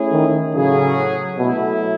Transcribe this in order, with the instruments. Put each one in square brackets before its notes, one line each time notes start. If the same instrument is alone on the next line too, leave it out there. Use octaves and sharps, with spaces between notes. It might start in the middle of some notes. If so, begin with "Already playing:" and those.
Already playing: [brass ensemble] A3 C#4 E4 G#4
[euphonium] D#3
[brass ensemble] A2 F#3 C#4 G#4 [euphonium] C#3
[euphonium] B2 [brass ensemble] F#3 A3 E4